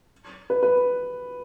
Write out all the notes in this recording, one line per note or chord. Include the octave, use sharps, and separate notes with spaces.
B4
B4